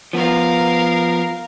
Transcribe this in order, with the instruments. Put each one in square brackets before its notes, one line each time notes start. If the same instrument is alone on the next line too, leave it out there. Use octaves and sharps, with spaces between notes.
[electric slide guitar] F3 B3 [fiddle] A#4 F5